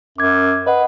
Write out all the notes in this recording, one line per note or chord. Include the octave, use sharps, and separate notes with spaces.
F#2 D6 G#6
B4 D#5 F#5